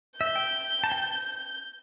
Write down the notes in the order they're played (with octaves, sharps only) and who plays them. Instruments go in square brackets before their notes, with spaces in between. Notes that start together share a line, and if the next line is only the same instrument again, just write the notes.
[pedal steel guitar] E5 [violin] G6
[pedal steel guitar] G5
A5
G5